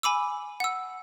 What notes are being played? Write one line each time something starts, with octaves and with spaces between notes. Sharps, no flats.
G#5 B5 D6 E6
F#5 E6